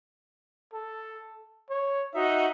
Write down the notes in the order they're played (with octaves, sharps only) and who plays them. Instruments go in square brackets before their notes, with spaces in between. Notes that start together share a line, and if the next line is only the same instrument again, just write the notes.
[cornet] A4
C#5
[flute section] D#4 F#4 [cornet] E5